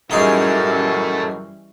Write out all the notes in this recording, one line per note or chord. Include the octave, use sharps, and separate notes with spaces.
F#2 E3 G3 C#4 D#4 G#4 A4 C#5